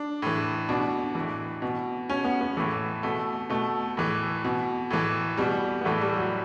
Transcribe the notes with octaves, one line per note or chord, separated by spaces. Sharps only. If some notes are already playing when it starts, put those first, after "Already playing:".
Already playing: D4
A2 E3
B2 D4
E3
A2
B2
B2 C#4
B3
B3
A2 E3 A3
B2 A3
B2 A3
A2 E3
B2
A2 E3
B2 G3
B3
A2 E3 A3
G3
F#3